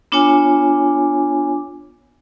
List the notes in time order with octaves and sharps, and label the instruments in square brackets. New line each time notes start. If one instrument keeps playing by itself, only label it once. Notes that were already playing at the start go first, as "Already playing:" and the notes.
[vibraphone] B3 D4 F4 C#5 G#5 D6